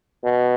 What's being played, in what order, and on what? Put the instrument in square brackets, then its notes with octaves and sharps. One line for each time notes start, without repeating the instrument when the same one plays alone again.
[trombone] B2